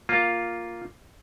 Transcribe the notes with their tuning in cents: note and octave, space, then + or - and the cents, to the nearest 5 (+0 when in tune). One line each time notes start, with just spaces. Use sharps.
A#3 +0 F4 +0